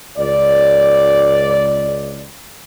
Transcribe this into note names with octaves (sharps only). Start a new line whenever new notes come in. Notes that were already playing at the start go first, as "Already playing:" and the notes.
C#2 D5